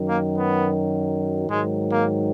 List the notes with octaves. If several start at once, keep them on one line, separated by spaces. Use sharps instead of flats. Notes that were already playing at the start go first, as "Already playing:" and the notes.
Already playing: F#2 D#3 F#3
A#3
B3
G#2 D#3 F#3 G#3
A#3